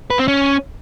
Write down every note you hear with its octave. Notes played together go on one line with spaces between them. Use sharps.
B4
C4
C#4